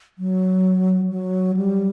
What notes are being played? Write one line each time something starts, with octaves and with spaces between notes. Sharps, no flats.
F#3
F#3
G3